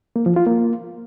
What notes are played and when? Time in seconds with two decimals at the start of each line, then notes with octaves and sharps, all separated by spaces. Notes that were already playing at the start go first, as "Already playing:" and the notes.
0.16 A#3
0.26 F3
0.36 F4
0.47 A#3